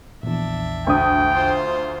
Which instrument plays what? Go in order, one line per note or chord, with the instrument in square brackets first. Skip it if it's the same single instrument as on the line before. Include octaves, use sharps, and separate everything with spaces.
[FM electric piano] A#1 E2 [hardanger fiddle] D4 E5
[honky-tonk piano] D2 D#6 [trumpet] G5
[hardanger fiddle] F4 C5